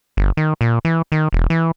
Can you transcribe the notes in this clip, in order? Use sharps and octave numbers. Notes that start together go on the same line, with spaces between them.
G1
D#3
A#2
E3
D#3
E1
E3